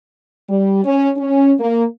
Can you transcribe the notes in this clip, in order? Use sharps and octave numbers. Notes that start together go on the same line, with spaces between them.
G3
C#4
C#4
A#3